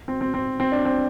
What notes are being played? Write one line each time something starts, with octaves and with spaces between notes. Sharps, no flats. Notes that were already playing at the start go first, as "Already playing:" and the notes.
C4
C4
C4
C4
D4
C4